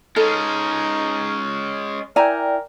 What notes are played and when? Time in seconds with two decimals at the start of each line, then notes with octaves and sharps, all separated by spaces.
0.16 G#3 C#4 D#4 A4 F6
2.16 E4 A#4 D5 G5 G#5 A#5